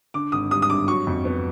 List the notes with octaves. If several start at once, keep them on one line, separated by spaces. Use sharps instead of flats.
D3 D6
G#1 D#6
G3 D#6
D#6
G2 D6
F#3 C#6
F2
B3